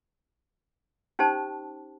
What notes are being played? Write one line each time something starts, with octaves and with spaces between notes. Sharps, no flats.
C#4 D#4 G4 C5 A5